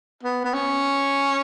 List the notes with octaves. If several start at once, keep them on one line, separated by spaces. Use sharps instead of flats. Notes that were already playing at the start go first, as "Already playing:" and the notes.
B3
B3
C#4